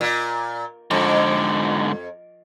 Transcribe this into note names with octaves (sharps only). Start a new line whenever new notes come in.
A#2
F2 G#2 D3